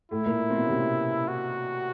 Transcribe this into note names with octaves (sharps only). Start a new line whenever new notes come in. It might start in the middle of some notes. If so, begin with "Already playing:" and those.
A2 A3 E4
A#2 A#3
C4
B2 B3
C#4
C3 C4
F#4